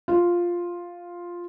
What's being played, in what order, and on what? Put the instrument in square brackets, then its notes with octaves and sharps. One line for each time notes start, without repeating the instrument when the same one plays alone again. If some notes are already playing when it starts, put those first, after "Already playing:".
[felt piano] F4